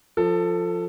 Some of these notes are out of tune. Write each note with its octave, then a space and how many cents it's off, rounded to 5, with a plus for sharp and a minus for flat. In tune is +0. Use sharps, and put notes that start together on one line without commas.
F3 +0 A4 +15